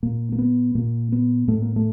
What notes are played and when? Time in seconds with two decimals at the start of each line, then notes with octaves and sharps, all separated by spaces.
0.03 A#2 A#3
0.32 A#3
0.39 B3
0.75 A#2 A#3
1.12 B3
1.48 A2 A3
1.62 A#3
1.76 A3